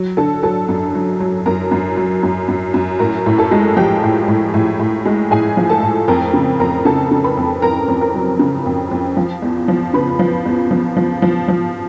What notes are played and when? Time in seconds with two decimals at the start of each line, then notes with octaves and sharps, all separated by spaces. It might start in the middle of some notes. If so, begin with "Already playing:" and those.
Already playing: F#3
0.17 D3 A4 A5
0.43 F#3 A4 A5
0.68 F#2
0.95 F#3
1.20 F#3
1.46 F#2 A#4 A#5
1.71 F#2
1.97 F#3
2.23 F#2
2.48 F#2
2.74 F#2
2.99 A2 A#4 A#5
3.26 A2
3.38 A4 A5
3.51 G#3
3.77 F3 G4 G5
4.03 A2
4.28 A2
4.54 A2
4.80 A2
5.06 G#3
5.31 A2 G#4 G#5
5.57 F3
5.69 A4 A5
5.82 A2
6.08 F2 A#4 A#5
6.33 C#3
6.60 F2 A#4 A#5
6.85 C#3 A4 A5
7.11 C#3
7.24 B4 B5
7.37 F2
7.62 F2 A#4 A#5
7.88 F2
8.01 A#4 A#5
8.14 F#3
8.39 C#3
8.65 F2
8.91 F2
9.17 F3
9.42 E2
9.68 F3
9.94 C#3 B4 B5
10.19 F3
10.45 E2
10.71 F3
10.97 F3
11.22 F3
11.48 F3